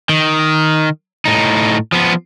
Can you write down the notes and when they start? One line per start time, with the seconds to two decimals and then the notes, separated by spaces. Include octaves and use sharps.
0.09 D#3
1.25 A2 D#4
1.92 F3 B3